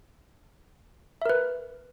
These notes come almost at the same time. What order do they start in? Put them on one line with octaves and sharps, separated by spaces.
E5 A#4 B4